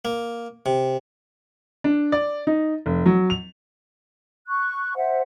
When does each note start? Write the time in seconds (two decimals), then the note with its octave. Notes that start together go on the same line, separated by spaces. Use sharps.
0.05 A#3
0.66 C3
1.84 D4
2.12 D5
2.47 D#4
2.86 F1
3.06 F#3
3.30 F7
4.48 C#6 F#6
4.95 C5 E5 F#5